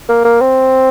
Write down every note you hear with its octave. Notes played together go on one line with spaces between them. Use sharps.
A#3
A#3
C4